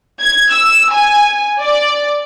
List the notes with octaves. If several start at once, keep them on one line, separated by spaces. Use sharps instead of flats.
G#6
E6
G#5
D5